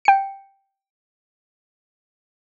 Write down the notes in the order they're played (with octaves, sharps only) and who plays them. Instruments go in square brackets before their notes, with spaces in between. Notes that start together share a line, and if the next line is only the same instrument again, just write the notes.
[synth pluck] G5 C#7